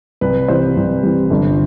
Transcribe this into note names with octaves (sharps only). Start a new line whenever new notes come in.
C2 B4
C3 E3 G3 C5
C2
C3 E3 G3
G1